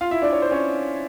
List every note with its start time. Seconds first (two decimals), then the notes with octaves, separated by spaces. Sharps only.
0.01 F4 F5
0.11 E4 E5
0.22 D4 D5
0.33 C#5
0.42 C5
0.51 C#4 C#5